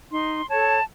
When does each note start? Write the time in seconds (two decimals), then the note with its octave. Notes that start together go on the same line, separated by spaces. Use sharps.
0.12 D#4 C6
0.49 A4 C#5 A5